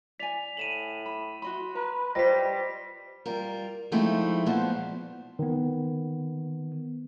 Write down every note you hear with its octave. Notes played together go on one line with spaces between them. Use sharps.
D5 G#5 B6 F7
A2 D#7 E7 F#7
B5
F#4 D#5 B5 C6
B4 A#5
G3 F4 G4 B4 C5 D#5 A#6 B6
G3 F4 A#4
F3 G#3 A3 C4 D#4 E4
A#2 F3 B3 A4 C5
D#3 B3